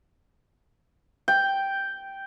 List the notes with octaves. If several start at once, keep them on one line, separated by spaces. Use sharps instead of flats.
G5